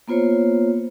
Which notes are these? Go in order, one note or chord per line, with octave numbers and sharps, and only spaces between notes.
A#3 B3 F4 C5 C#5